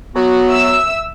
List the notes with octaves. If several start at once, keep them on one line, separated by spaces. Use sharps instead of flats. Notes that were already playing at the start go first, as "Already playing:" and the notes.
F#3 B3 F#4
E5 E6